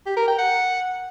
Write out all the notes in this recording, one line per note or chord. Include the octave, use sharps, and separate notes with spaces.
G4
A#4
G5
F#5